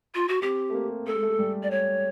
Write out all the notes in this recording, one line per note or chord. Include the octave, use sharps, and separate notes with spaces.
F4
F#4
C4 G4
A3
A#3
A3 A4
G#3
A3
G#3
G3
D5
C#5